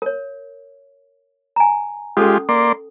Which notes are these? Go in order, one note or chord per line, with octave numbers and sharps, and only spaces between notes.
A#4 C#5
G#5 A#5
G#3 C#4 F4 G4 A4 D#6
A#3 D5 C6